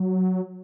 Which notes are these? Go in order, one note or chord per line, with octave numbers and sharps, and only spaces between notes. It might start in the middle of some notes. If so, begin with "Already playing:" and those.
Already playing: F#3